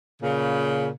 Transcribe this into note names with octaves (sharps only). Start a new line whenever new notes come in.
A#2 C#3